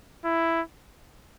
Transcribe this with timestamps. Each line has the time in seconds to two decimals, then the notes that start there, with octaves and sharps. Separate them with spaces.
0.25 E4